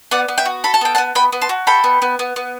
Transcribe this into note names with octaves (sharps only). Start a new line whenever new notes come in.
B3 D5 F#5
B3
E5 G5
F#4
A4 B5
A5
B3 G5
F#5 A5
B3
B3 G5 B5
B3
A5 C6
F#4
A4 G5 B5
B3
B3
B3
B3